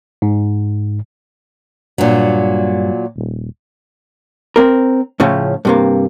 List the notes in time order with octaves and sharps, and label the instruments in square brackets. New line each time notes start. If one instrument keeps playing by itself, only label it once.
[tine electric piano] G#2
[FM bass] G2 [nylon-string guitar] A#2 F#3
[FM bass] D#1
[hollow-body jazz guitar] C4 A#4
A2 C#3 F3 C#4
G2 C3 A#3